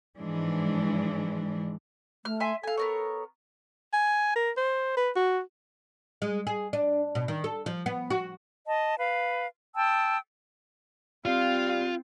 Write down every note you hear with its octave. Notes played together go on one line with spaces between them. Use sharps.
G#2 E3 F3 G#3 D4
A3 F6
E5 G#5 C6
A4 F5 G#5
B3 A#4 C#5
G#5
A#4
C5
B4
F#4
G#3
G#4
D4
B2
D#3
A4
F3
B3
F#4
D#5 A5
B4 F5
G5 A5 D#6 E6
G3 C4 F4 F5